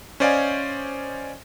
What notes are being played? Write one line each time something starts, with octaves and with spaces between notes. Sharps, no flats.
C#4 C5 D5 D#5 F5 G#5